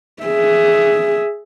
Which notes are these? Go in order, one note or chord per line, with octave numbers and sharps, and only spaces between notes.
G#4 E5